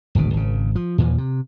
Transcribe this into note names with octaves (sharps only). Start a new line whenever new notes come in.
D1 G#1 D2 B2
G#1 C#3
F3
D#2 A#2 E3 F3
C3